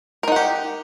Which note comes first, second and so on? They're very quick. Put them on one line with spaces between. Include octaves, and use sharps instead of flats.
A#4 D#4 F#5 G4